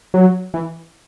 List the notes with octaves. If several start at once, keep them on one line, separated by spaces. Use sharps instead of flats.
F#3
E3